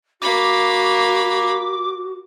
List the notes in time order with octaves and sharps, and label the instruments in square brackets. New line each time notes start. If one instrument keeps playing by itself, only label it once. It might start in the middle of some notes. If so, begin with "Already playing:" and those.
[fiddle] A#3 B5 [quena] F#4 [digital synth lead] D6